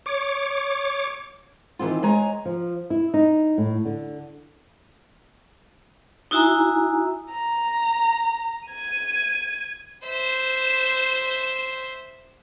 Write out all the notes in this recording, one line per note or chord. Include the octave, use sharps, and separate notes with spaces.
C#5 D6
D#3 E3 C4 F4
G#3 C#5 G#5 A#5
F3
E4
D#4
A2
D3
D#4 E4 F#4 E5 G#5 A#5
A#5
G#6 D#7
C5 E5